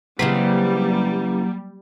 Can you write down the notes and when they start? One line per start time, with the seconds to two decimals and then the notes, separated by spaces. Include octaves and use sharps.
0.19 C#3 E3 F#3 G3 A#3 C4 A#5